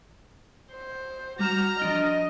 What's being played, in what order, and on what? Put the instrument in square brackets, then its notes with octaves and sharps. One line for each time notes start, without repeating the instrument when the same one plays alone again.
[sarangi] C5
[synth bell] G3 E7 [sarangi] F#4 [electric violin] A#5 F6
[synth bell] F3 D4 G7 [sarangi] D#5